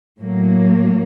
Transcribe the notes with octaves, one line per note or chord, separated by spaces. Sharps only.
A2 F#3 A#3